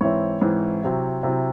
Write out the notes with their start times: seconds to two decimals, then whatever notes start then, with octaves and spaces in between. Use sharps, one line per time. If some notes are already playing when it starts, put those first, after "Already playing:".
0.01 G#2 E3 C4 E4 C#5
0.41 G#2 E3 C4 E4
0.82 C3 F#3 C4 E4
1.23 C3 F#3 C4 E4